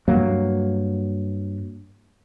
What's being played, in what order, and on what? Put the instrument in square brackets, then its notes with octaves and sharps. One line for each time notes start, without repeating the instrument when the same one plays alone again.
[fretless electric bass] G2 F#3 A#3